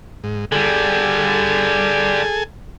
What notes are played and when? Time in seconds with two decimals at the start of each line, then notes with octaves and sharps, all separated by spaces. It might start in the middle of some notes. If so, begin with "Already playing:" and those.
0.24 G#2
0.52 D3 G3 G#4 A4 G#5